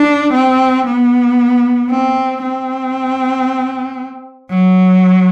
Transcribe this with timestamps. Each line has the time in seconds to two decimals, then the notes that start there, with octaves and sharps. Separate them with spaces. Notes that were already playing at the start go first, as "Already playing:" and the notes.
Already playing: D4
0.33 C4
0.87 B3
1.90 C4
2.42 C4
4.50 F#3